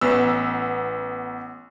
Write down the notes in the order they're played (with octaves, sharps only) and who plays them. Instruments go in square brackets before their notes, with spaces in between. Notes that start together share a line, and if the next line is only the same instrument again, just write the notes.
[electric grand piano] A1 B3 E6